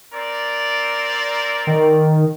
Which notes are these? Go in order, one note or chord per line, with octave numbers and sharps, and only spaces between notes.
C4 A#4 D5
D#3